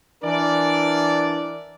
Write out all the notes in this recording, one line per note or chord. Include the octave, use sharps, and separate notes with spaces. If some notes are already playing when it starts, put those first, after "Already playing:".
E3 D4 A#4 D5